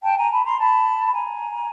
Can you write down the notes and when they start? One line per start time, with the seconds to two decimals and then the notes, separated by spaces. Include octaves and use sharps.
0.04 G5 A5
0.17 G#5 A#5
0.31 A5 B5
0.45 A#5 C6
0.59 A5 B5
1.06 B5
1.13 G#5 A#5